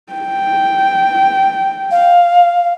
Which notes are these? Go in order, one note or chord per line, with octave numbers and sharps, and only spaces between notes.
G5
F5